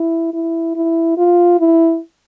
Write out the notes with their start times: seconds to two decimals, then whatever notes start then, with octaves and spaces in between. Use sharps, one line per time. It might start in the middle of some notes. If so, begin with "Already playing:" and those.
Already playing: E4
0.33 E4
0.76 E4
1.18 F4
1.60 E4